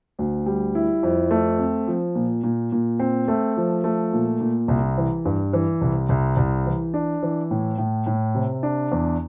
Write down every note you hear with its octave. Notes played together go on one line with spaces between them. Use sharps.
D2
G3
E4
F2
A3
C4
F3
A#2
A#2
A#2
C4
A3
F3
A3
A#2
A#2
C2
E3
G2
E3
C2
C2
C2
E3
D4
E3
A2
A2
A2
C3
D4
E2